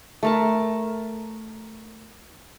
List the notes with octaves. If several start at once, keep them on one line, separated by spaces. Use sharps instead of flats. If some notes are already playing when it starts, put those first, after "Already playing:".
A3 A#4 A5